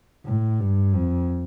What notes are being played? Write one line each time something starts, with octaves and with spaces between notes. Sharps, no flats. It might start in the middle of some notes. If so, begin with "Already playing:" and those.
A2
G2
F2